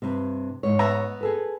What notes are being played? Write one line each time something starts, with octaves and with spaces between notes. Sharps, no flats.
G2 C3
G#2 C#5
B3 E5 A#5
G#4 A4 B4